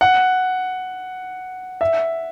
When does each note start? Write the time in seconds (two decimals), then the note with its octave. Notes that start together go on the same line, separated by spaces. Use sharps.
0.01 F#5
1.81 E5